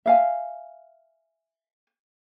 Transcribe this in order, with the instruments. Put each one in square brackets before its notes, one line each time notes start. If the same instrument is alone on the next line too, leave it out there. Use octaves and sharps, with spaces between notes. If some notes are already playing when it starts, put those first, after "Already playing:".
[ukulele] E5 F5 G#5